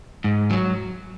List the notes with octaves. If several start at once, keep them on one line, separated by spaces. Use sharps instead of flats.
G#2
F#3